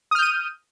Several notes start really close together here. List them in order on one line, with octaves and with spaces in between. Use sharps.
D#6 F6 G6 D#7